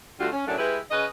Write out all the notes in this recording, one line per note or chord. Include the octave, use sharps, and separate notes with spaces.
D3 G3 A3 F4 F#4
C#4
F#2 A2 F#3 D4
G#3 E4 G4 B4
C#3 C#4 B4 D#5